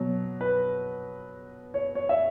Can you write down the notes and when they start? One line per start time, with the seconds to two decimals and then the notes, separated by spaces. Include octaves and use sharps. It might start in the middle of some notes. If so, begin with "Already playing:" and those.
Already playing: B2 F#3
0.41 B4
1.74 C#5
1.95 C#5
2.09 E5